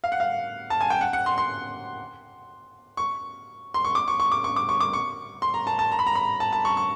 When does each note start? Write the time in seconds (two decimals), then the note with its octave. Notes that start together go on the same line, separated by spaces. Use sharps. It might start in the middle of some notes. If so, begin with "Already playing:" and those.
0.04 F5
0.12 F#5
0.20 F5
0.70 A5
0.81 G#5
0.90 G5
1.01 F#5
1.13 F#5
1.26 C6
1.38 C6
2.97 C#6
3.74 C6
3.84 C#6
3.95 D6
4.08 C#6
4.20 C#6
4.32 D6
4.44 C#6
4.56 D6
4.69 C#6
4.80 D6
4.93 C#6
5.42 C6
5.54 A#5
5.67 A5
5.79 A5
5.92 A#5
5.99 B5
6.06 A#5
6.15 B5
6.40 A5
6.53 A5
6.65 C#6
6.77 C#6